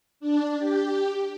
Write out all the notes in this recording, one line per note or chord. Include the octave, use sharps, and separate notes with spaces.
D4
G4